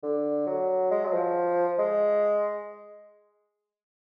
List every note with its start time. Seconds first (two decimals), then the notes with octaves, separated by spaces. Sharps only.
0.03 D3
0.47 F#3
0.91 G#3
1.05 F#3
1.13 F3
1.79 G#3